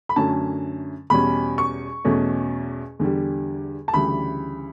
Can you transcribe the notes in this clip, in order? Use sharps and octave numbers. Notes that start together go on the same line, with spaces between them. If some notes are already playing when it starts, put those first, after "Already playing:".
B5
F#2 D3 A3 C#4 A5
E2 B2 G3 C#4 B5
C#6
E2 B2 A3 C#4
E2 D3 G3
A5
D2 C#3 E3 G3 B5